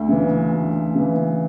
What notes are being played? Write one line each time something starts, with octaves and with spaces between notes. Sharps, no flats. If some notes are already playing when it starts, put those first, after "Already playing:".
Already playing: D2 E5
C#3 E3
D2
C#3 E3